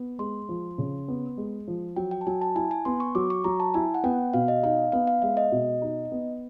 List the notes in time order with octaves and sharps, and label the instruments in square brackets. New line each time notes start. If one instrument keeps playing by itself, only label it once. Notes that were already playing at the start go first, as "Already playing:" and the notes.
Already playing: [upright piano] B3
[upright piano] G#3 [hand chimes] C6
[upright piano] F3
C#3
B3
G#3
F3
[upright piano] F#3 [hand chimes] G5
[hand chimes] G5
A5
[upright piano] F#3 [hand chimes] G#5
[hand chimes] A5
[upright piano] E4 [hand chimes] G#5
[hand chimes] G#5
[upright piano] B3 [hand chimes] C6
[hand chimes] C#6
[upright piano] F#3 [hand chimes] D6
[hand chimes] C#6
[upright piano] F#3 [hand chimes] A#5
[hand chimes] A5
[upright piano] E4 [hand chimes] G#5
[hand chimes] F#5
[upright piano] B3 [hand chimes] G5
[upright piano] B2 [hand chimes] F5
[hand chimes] D#5
[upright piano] D#4 [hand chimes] F5
[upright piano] B3 [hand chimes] F5
[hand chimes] F5
[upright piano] G#3 [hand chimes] E5
[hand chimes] D#5
[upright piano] B2
D#4
B3